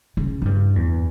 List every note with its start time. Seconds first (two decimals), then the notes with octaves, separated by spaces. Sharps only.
0.17 C#3
0.42 G#2
0.45 G2
0.76 E2